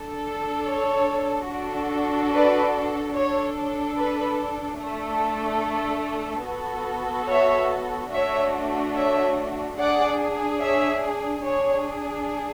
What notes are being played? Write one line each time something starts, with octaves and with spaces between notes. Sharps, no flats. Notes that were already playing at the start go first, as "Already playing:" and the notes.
Already playing: D4 A4
C#5
D4 F#4 A4
B4 D5
D4 A4 C#5
B4
A3 D4 A4
B3 F#4 A4
C#5 E5
A3 D4 F#4 C#5 E5
C#5 E5
D4 G#4 D5 F#5
C#5 E5
D4 G#4 C#5